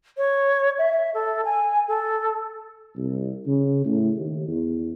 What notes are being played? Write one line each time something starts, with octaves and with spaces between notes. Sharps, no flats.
C#5
E5
E5
A4
G#5
A4
C2
C#3
A2
D#2
E2